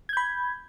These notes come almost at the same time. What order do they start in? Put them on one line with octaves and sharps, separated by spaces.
G#6 G6 B5